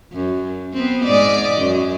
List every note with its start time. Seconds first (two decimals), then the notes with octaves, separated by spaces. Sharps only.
0.13 F#2
0.73 B3 C4
1.05 G#2 D5 D#5
1.58 F#2